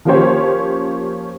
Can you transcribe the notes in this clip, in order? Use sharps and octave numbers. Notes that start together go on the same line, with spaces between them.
F3 A#3 C#4 G4 C5 C#5